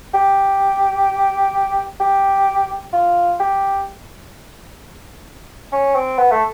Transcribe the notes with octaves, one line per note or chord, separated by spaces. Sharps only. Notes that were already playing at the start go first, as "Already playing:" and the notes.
G4
G4
F4
G4
C#4
C4
B3
A3